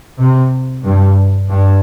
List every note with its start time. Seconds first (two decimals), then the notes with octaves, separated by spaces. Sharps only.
0.18 C3
0.83 G2
1.49 G2